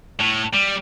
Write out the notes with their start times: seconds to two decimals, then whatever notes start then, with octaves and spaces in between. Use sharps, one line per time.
0.20 A2
0.53 G3